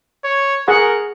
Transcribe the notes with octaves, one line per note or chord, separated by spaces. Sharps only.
C#5
G#4 A#4 F#5 C#6